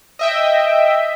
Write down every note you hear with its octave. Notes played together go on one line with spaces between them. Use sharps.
D#5 E5 G5